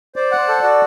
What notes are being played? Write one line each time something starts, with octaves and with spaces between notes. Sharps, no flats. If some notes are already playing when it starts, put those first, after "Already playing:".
C5 D5
F#5
C5
A4
F#4 D5